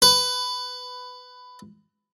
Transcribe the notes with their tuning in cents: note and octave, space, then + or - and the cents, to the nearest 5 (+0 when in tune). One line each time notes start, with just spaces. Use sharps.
B4 +15